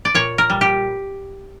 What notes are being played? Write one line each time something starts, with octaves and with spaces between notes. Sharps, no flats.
D5
A#2 C#5
A#4
G3
G4